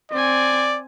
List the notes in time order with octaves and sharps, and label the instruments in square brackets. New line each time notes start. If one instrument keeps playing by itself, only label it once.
[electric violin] C4 G#5 [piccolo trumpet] D5